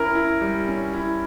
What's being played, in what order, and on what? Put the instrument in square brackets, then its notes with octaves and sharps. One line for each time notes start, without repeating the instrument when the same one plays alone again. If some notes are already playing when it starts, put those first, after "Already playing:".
Already playing: [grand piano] C#4 E4 [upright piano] A#4
[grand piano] E4
G3
C#4
E4